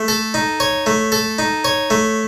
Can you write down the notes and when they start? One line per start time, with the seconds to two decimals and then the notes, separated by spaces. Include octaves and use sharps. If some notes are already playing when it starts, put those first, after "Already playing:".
Already playing: A3
0.08 A4
0.34 D#4
0.60 C#5
0.86 A3
1.12 A4
1.39 D#4
1.64 C#5
1.90 A3